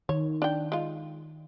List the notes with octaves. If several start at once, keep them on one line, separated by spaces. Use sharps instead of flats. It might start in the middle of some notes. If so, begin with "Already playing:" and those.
D#3 C#5
D4 G5
G#3 F4